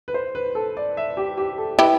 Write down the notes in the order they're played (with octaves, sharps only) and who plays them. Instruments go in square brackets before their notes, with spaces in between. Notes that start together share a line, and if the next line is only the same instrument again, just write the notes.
[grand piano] B4
C5
B4
A4
D5
E5
G4
G4
A4
[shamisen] E4 G4 [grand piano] B4